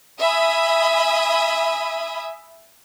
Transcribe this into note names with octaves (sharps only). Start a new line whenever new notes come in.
E5 G#5 B5 D#6